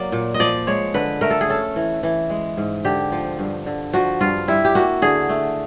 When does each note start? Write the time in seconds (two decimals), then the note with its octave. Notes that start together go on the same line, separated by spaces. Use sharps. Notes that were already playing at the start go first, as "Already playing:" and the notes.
Already playing: F#3 A#3 D5
0.12 A#2
0.34 D#5
0.40 F3 D5
0.67 G#3 C#5
0.94 D3 B4
1.21 A3 A#4
1.30 A4
1.41 G#4
1.48 C#4 A4
1.76 E3
2.03 E3
2.30 G#3
2.57 G#2
2.85 D3 G4
3.12 F3
3.39 G2
3.66 D3
3.93 F3 F#4
4.21 G2 F4
4.48 G3 E4
4.65 G4
4.75 A#3 F#4
5.02 D3 G#4
5.29 A3